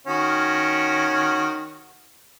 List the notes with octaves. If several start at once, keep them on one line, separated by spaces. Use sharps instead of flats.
D#3 C#4 F#4